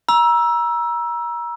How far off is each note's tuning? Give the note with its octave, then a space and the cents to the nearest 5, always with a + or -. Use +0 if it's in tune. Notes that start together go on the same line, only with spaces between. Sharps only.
A#5 +30 E6 +5